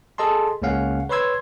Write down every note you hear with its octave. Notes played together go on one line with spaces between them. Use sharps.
G#4 A4 D#5 A5 C6
C#2 C#3 A#3 C#4 F5 F#5
B4 C#5 B5 C6 E6 G#6